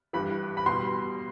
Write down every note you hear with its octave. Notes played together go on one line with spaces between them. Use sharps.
G2 E3 G3 B5
B5
B2 G3 C6